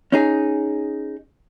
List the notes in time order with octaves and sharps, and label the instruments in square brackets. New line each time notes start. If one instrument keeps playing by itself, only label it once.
[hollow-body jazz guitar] C#4 D#4 G#4